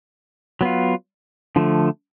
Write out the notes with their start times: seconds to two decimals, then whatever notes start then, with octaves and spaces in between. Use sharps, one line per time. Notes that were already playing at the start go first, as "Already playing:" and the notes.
0.61 F#3 B3 F4
1.56 D3 F3 A3